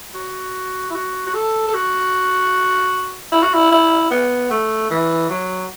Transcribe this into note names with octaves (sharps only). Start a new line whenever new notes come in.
F#4
E4
F#4
F#4
A4
A4
F#4
E4
F#4
E4
E4
B3
A3
E3
F#3